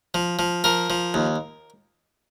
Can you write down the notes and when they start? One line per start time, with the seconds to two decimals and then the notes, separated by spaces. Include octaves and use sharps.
0.14 F3
0.39 F3
0.64 F3 A#4
0.90 F3
1.14 D#2